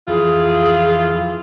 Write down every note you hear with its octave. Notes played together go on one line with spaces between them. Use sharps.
F2 E3 F4 G#4